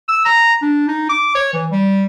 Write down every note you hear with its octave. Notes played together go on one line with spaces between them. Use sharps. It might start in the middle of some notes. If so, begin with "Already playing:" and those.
E6
A#5
D4
D#4
D6
C#5
E3
G3